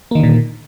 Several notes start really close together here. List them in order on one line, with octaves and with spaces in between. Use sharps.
A#3 D#3 D3 A#2